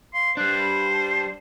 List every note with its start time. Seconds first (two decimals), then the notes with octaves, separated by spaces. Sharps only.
0.14 F5 C6
0.37 G3 D4 C5 F#6
0.59 B5
0.94 A5